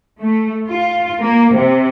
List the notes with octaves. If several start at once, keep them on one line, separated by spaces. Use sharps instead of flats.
A3
F4
A#3
C3